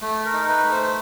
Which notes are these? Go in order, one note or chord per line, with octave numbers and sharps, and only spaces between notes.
A3
A#4
D#4
B4
A3
C5